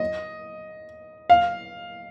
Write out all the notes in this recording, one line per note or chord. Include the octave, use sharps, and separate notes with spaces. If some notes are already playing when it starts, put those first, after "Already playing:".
Already playing: D#5
F5